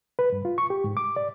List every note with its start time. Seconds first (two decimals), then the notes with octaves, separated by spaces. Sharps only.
0.19 B4
0.32 G2
0.45 F4
0.58 C#6
0.70 G4
0.84 G#2
0.97 D6
1.16 D5